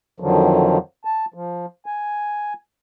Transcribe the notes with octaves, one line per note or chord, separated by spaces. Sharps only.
F2 D3 D#3 F3 F#3
A5
F3
G#5